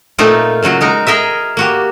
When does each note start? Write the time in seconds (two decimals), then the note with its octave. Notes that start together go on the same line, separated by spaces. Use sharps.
0.18 A#2 A3 C4 D#4 F4 A#4
0.62 A#2 C#3 F#3 F#4
0.81 G#3 D#4 A#4
1.07 G#4 A#4 D#5 E5
1.57 A#3 F#4 G4